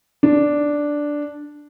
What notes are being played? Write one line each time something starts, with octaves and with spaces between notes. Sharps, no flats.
D4